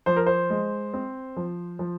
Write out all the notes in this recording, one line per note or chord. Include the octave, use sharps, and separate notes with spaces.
F3 C5
A#4
C5
G#3
C4
F3
F3